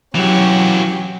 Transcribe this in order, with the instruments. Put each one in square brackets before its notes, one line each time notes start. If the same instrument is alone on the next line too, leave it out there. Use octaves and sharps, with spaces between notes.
[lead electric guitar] E3 F#4 [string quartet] F#3 C#4 G4